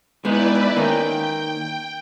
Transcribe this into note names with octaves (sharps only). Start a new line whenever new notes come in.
G#3 B3 D#4 E4 B4 D5
D#3 A#3 C#4 G5